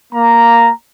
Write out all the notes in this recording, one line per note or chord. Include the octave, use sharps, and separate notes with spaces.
A#3 A#5